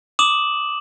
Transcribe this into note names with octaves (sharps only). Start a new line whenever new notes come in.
D6 D#6 E7 F#7